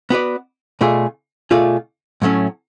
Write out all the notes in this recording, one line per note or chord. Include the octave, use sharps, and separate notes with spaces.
B3 F#4 B4 D5
B2 A3 F4 G#4 D5
B2 A3 F4 G#4 D5
A2 F#3 A3 C#4